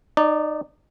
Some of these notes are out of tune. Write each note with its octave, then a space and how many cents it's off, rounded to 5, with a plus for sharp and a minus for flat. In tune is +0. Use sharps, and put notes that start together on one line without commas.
D#4 -25 D5 +0